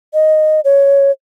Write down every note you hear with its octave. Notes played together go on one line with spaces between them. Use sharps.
D#5
C#5